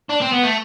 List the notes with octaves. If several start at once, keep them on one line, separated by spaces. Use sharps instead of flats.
D4
C4
B3
A3